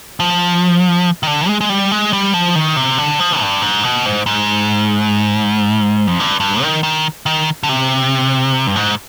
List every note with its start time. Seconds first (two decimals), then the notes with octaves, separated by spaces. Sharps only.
0.20 F3
1.23 D#3
1.27 D3
1.48 G#3
1.61 G#3
1.69 G3
1.92 G#3
2.13 G3
2.34 F3
2.56 D#3
2.77 C3
2.98 D3
3.19 F3
3.41 G2
3.62 G#2
3.83 B2
4.06 G#2
4.26 G#2
6.07 F2
6.20 G2
6.40 G2
6.62 D#3
6.83 D#3
7.26 D#3
7.63 D3
7.69 C3
8.67 G2
8.76 G#2